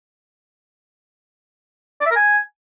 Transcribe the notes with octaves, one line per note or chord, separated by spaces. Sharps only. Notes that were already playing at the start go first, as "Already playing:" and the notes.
D5
E5
A#4
G#5